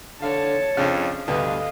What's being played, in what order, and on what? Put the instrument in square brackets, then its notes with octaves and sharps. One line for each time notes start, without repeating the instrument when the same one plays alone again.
[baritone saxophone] D3 [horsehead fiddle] C#5 A5 [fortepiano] F5
[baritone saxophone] F2 [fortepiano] C#3 D4
[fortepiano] D2 D3 B3 [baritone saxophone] G2 [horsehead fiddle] D#5 F5